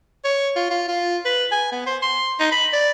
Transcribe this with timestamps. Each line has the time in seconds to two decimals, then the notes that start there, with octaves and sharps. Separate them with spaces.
0.25 C#5
0.56 F4
0.71 F4
0.88 F4
1.25 B4
1.52 G#5
1.72 B3
1.87 C5
2.02 C6
2.40 D#4
2.52 B5
2.73 D5